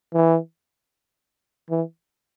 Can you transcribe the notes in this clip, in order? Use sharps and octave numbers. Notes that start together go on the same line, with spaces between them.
E3
E3